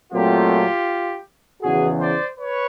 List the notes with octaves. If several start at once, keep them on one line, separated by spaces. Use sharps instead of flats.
A#2 F#3 A3 C4 F4 G4
E2 C#3 E3 F#4 G#4
C5 D5
B4 C#5